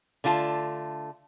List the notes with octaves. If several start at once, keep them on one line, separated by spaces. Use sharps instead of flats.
D3 A3 F4 A5